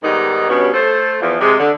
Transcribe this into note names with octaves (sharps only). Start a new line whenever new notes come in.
G#2 D#3 G3 B3 D#4
G2 B2 B3 C#4
A3 A4 C5
E2 F3
C3 G#3
D3